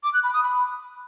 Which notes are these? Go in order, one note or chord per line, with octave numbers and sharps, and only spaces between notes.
D6
F#6
B5
D#6
B5